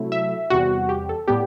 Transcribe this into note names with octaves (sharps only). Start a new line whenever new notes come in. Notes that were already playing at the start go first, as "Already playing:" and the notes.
Already playing: C3 F#3 A3 E4
E5
E2 C3 G3 F#4
G4
A4
A2 G3 B3 G4